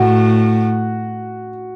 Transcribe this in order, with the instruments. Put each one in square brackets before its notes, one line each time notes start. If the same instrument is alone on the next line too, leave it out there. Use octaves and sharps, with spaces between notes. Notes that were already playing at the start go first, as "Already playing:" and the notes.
Already playing: [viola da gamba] A2 [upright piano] F#4